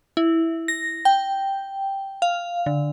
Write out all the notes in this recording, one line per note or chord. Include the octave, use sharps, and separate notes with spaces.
E4
A#6
G5
F5
D3